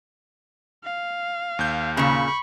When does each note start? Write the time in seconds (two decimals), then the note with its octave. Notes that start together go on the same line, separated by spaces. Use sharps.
0.84 F5
1.59 D#2 G6
1.97 A#2 C#3 B5 C#6